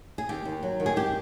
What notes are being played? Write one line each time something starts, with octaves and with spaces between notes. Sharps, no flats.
G#4
D#2 G4
D#2
F#3
D#3
G#4
G2 G4